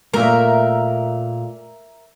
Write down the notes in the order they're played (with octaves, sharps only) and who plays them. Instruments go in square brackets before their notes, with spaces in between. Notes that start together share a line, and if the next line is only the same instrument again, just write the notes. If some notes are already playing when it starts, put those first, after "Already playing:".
[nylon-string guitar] A#2 A3 [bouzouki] A#4 E5